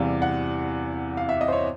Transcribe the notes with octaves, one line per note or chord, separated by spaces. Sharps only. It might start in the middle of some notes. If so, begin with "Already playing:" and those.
Already playing: E2 C3 E3 G3 F5
F#5
F5
E5
D#5
C5
C#5